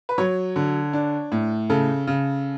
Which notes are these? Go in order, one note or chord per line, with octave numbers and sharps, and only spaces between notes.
B4
F#3 C#5
D3
D4
A2
C#3 A4
C#3